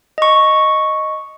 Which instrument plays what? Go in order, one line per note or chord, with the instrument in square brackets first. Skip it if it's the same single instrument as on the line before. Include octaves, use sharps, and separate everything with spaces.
[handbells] D#5 C#6